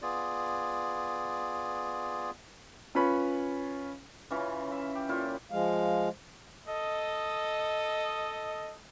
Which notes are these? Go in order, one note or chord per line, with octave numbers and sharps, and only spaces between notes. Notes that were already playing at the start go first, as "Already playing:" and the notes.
B3 F4 G#4 D5
C#4 F4 B4 C#5 B5 C#6
C#3 E3 C#4 F4
E5
G4
A#2 E4 F4 C#5
F3 G#3 F5
A4 D#5